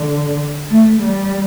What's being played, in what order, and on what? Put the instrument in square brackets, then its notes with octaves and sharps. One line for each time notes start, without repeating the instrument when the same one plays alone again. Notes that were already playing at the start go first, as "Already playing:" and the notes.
Already playing: [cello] D3
A3
G3